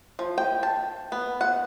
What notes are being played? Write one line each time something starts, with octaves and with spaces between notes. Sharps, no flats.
F3
G5
A5
B3
F#5